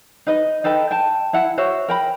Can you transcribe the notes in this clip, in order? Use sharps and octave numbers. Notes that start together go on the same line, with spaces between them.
D#4 B4 D#5
D#4 A4 B4 G5
G5 A5
E4 E5 F#5
F#4 C5 C#5 E5
A#4 G5 B5